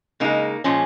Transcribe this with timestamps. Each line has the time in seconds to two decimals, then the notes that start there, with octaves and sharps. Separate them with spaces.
0.20 C#3 G#3 A#3 D#4
0.64 A#2 F3 G#3 C#4